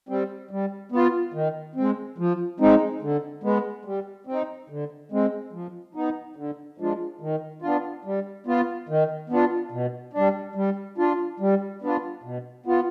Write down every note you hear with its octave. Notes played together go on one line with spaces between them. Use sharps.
G3 C4
G3
B3 F4
D#3
G#3 C4
F3
G#3 C4 D#4
D3
G#3 B3
G3
C4
D#4
D3
G#3 C4
F3
B3 D#4
D3
F3 G#3 D4 F4
D#3
B3 D4 F4
G3
B3 F4
D#3
B3 D4 F4
B2
G3 D4
G3
D4 F4
G3
B3 D4 F4
B2
B3 F4